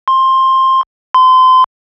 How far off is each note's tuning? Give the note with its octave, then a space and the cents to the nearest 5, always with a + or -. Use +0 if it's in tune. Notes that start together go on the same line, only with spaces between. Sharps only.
C6 +15
C6 -30